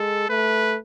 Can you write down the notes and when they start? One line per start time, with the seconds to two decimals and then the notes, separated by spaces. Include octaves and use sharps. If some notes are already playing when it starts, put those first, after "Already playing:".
Already playing: G#3 A4
0.29 A3 B4